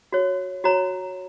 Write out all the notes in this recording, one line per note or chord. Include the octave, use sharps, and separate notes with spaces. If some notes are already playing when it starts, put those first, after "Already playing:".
F#4 C#5
F#4 C#5 A#5